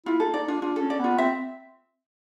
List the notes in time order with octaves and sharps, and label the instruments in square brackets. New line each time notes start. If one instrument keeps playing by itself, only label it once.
[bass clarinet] E4 [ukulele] F4
[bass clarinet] D#4 [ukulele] A4
[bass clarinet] D#4 [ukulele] D5
[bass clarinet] D4 [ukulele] F4
[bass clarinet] D4 [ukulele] F4
[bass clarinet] C#4 [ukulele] A4
[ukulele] D5
[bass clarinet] B3 [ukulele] F4
[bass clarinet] C4 [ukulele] E5